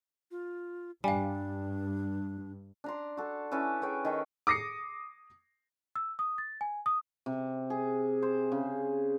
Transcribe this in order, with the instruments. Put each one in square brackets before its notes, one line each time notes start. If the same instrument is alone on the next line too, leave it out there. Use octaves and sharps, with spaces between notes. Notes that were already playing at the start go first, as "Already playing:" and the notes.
[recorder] F4
[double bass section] G2 [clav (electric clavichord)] G3 [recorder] D4 [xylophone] F5 G#5
[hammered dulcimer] D4 A#5 C6
F#4 A4
C#4 E4 A4 B4
G#4 B4 C#5 G5
D#3 A4 B5
[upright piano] D6 D#6 A#6 C7 C#7
[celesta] E6
D#6
A6
G#5
D#6
[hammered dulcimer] C3
G#4
C5
C#3